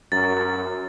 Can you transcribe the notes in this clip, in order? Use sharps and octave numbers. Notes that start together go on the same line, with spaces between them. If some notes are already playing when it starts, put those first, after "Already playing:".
F#2 A6